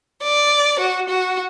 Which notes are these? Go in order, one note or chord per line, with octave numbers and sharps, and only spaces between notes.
D5
F#4
F#4